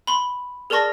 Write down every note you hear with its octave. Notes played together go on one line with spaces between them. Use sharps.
B5 C6
G#4 A#4 D5 A5 C#6 A#6